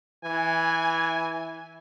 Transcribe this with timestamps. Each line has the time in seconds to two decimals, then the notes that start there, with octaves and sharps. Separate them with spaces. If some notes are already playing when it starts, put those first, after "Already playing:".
0.24 E3 G#5